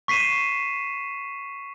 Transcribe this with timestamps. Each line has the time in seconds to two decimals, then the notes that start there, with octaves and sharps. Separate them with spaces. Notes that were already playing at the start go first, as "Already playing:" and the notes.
0.08 C#6 B6 C7 D#7 E7